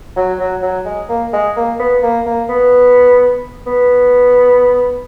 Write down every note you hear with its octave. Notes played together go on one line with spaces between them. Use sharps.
F#3
F#3
F#3
G#3
A#3
G#3
A#3
B3
A#3
A#3
B3
B3